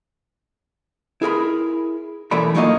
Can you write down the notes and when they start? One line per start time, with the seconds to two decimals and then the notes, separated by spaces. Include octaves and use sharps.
1.22 E4 G#4 A#4 B5
2.31 B1 F#2 E3 A3 D5 B5
2.55 F#3 A3 A#3 D#4 F4 D#5